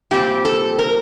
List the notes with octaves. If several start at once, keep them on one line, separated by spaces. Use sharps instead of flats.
A#2 G3 C4 G4
A4
A#4